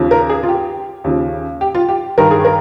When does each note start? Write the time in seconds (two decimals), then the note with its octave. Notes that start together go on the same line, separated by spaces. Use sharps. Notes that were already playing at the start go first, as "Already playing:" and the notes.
Already playing: D#2 C#3 F3
0.11 A#4
0.30 G#4
0.43 F4
0.49 G4
1.04 D#2 C#3 F3
1.61 G4
1.75 F4
1.89 G4
2.18 G2 D#3 A#4
2.31 G#4
2.45 A#4